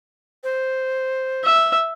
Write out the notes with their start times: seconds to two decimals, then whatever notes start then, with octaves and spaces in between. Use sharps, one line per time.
0.44 C5
1.44 E5